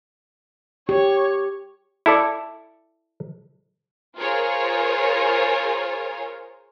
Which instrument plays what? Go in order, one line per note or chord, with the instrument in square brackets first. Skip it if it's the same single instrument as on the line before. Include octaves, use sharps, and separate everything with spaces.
[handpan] G4 [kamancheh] C#5
[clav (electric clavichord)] E4 A4 D5
[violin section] F4 G#4 A#4 C5 C#5